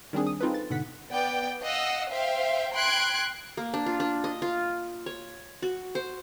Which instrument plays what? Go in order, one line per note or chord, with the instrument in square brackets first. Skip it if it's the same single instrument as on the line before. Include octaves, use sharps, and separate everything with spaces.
[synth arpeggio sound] D#3 G3 C4 D4 G#4
D#6
C4 D#4 F4 G#4 A4 B4
A6
G#2 B2 D3 F#5 B6
[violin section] B3 D5 G5
D#5 F5 F#5 E6
C5 E5 F5 G5
G5 B5 C6 F#6 G#6 D7
[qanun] A#3
D4
F4
D4
D#5
F4
C#5
F#4
C5